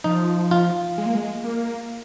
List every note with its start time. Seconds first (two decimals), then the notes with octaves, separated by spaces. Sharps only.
0.04 F3 D#4
0.51 F4
0.98 G#3
1.06 A#3
1.15 G#3
1.44 A#3